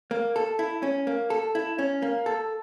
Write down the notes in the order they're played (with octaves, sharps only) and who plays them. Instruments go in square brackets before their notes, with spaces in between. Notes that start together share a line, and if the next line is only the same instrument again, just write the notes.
[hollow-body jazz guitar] A#3
A4
E4
C#4
A#3
A4
E4
C#4
A#3
A4